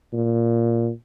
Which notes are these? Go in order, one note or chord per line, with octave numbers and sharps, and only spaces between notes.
A#2